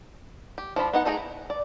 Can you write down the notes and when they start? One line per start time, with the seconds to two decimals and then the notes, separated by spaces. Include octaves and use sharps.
0.58 G4
0.76 F3 D4 F4 B5
0.93 B3 D#4 F#5
1.05 A3 D#4 G#4 G5 A#5
1.17 E4
1.50 D5